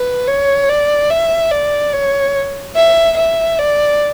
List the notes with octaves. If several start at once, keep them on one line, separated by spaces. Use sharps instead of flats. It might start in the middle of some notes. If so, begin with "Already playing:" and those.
Already playing: B4
C#5
D5
E5
D5
C#5
E5
E5
D5